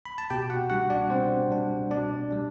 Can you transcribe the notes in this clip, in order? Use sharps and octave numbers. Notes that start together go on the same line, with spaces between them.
B5
A5
B2 G4 G5
F#4 F#5
G3 D4 F#4 F#5
D4 D5
B2 C4 C5
G3 D4
B2 D4 D5
G3 D4